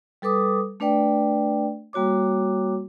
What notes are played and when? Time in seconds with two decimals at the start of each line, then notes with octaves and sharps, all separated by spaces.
0.22 G3 A4 B4 D6 D#6
0.80 A3 D4 B4 D5 G5
1.93 G3 A#3 F#4 C#5 D6